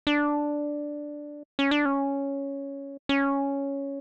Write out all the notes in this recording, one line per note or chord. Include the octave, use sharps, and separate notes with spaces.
D4
C#4
D4
C#4
C#4